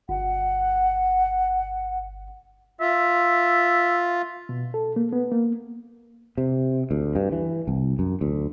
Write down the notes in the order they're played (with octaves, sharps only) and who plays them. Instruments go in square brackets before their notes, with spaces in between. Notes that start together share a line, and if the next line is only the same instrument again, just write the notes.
[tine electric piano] G1 [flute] F#5
[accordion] F4 [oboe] E5
[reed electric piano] B2
A4
A#3
B3
A#3
[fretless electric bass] C3
D2
G2
E3
C2
F#2
D2